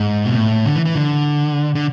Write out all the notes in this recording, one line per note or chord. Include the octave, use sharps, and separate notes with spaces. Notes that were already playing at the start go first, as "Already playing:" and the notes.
Already playing: G#2
B2
A2
D3
E3
E3
D3
D3